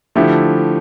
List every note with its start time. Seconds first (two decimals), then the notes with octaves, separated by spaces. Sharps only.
0.16 D3 F3 A3 E4 G4